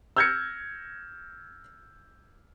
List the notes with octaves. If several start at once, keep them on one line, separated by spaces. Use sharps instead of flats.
E6 F6 G6 G#6 A#6 C#7